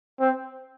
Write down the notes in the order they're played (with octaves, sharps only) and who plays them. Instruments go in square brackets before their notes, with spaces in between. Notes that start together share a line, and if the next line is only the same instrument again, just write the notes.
[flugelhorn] C4